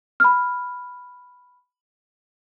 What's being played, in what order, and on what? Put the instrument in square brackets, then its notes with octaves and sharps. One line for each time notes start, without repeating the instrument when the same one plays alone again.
[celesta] B5 F6